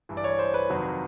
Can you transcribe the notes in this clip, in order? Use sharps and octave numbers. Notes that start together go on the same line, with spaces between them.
G2 E3
D5
C#5
C5
B4
F2 C3 D#3 F#3